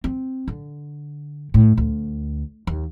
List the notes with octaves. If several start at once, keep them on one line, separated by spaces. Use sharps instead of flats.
C4
D3
A2
D2
D#2